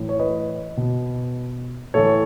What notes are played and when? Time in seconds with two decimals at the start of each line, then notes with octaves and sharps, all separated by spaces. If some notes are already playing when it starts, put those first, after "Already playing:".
Already playing: A2 E3
0.09 C#5
0.19 B4 D#5
0.77 B2
1.94 A2 E3 A4 C#5